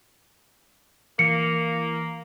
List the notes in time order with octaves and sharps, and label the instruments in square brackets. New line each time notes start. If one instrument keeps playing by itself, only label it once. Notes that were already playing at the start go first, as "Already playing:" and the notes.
[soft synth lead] E3 [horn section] A#3 [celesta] C#7